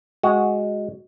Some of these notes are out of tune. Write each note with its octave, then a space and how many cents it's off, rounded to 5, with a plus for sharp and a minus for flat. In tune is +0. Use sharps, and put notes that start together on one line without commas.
G#3 +0 F#4 +0